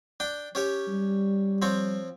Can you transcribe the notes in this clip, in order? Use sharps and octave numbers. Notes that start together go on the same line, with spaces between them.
D4 G5
C#4 G4 C#5
G3
F3 C4 C#5